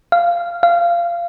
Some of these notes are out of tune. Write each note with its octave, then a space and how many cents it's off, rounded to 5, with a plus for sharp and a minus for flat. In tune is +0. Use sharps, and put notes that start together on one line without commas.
F5 -15
F5 -20